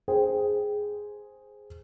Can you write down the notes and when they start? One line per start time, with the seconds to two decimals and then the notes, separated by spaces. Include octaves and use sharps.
0.08 G#4 C5 G5